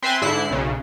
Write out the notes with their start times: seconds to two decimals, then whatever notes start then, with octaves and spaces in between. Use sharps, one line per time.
0.03 C4 B4 C5 E5 G#5 C6
0.22 G#2 D3 E4 F#6 C7
0.50 B1 C#3